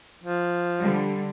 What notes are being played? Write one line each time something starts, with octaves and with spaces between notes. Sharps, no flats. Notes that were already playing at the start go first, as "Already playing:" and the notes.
F3
D3 G3